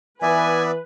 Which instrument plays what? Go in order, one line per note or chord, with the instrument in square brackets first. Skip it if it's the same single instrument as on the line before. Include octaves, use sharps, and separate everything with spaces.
[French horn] E3 [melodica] B3 D5 E5 [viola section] B4 [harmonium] G#5